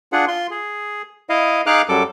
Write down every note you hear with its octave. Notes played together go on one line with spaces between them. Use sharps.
D4 F4 G#4 F#5
F4 C6
G#4
E4 D#5 F5
D#4 G#4 F5 D6 F6 F#6
F#2 F#3 G3 A4 D6